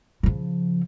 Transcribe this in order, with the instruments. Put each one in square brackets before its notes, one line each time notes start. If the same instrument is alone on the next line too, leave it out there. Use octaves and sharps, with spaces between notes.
[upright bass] C#3 F3